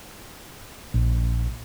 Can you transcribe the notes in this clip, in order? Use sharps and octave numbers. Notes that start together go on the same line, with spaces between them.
A#1